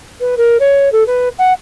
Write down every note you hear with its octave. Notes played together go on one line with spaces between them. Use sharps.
B4
A#4
C#5
A4
B4
F#5